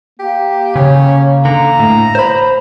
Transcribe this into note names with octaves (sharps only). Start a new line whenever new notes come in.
A#3 G4
C#3 C#4
D3 A#5
A2
C5 B5